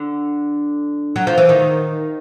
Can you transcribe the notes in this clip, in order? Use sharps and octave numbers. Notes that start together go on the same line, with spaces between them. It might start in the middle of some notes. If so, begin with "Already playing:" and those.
Already playing: D3
F#3
F3
E3
D#3